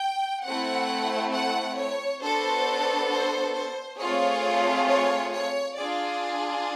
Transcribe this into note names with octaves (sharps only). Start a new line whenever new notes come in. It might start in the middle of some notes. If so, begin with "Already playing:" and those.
Already playing: G5
A3 C4 E4 F#5
F#5
C#5
B3 D4 F#4 A4 C5
C5
C5
A3 C4 F4 G#4 C#5
C#5
C#5
D4 F4 G#4 D5